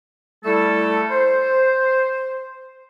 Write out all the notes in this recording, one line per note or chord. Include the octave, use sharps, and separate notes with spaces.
G3 A3 E4 A4
C5